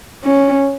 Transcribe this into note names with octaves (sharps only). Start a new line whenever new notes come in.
C#4